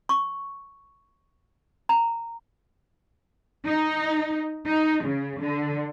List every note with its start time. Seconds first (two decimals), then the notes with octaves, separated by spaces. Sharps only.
0.09 C#6
1.89 A#5
3.66 D#4
4.67 D#4
5.04 C#3
5.40 D3